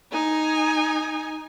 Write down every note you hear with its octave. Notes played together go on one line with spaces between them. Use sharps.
D#4 G#5